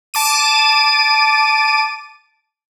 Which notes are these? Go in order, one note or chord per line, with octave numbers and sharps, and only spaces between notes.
A5 D6 D#7